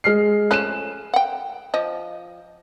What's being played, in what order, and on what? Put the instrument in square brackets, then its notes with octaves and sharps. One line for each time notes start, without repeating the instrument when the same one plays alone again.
[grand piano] G#3 F6 C7
[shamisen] F3 A3 C#4 [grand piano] F#6 E7
[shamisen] F#5 G5
F3 D#5